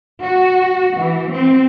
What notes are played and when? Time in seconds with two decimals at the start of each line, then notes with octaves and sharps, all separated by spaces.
0.20 F#4
1.00 E3
1.33 C4